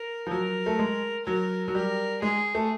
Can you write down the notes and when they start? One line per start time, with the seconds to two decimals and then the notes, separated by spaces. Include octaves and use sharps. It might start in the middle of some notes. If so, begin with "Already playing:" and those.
Already playing: A#4
0.27 F3
0.31 F#3 A#4
0.66 A3
0.79 G#3
1.26 F#3 A#4
1.68 F#3
1.74 G3 A#4
2.22 G#3 G#4
2.55 A3